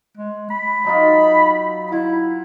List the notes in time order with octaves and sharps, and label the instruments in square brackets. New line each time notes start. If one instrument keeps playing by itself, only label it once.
[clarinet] G#3
B5
[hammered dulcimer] F#3 D#4 F4
[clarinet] E4 [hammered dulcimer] F4 F#5